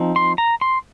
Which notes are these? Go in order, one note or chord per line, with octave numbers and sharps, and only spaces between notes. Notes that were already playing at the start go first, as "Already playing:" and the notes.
Already playing: F3 C4 D#4
C6
A#5
C6